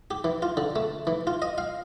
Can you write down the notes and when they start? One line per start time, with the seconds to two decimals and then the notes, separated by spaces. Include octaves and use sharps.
0.11 G4
0.24 E3
0.42 F4
0.57 D3
0.76 A3
1.07 E3
1.27 F4
1.42 D#5
1.58 F5